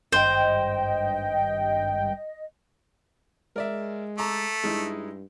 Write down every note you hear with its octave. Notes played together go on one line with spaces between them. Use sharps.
G#1 G2 C5 D#5 G5
G#3 A#4 D5 E5
A3 A#5 D6
G2 G#3 D#4 E4